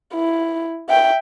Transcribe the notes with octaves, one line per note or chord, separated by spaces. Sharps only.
E4
E5 G5